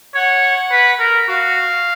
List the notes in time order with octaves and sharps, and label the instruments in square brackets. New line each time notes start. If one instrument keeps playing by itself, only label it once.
[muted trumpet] C#5 [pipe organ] F#5
[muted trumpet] B4
A#4
[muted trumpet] F#4 [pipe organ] F5